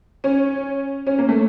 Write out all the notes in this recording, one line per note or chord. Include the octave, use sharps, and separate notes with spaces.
C#4
C#4
A#3
A3